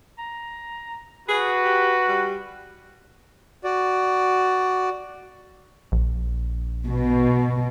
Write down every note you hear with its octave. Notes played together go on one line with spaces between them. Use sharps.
A#5
F#4 G#4 B4
G4
G3
F#4 D5
A#1
B2